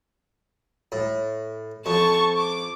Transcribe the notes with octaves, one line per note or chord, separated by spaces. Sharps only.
A2
F2 A5 C#6
D6